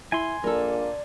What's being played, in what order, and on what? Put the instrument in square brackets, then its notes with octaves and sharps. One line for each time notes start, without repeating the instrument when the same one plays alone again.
[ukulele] E4 [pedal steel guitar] G#5 C6
[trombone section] A#1 A#3 [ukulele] A4 A#4 [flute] D5